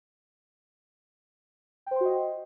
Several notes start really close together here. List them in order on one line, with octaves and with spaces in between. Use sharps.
G5 C5 C6 F#4 D#5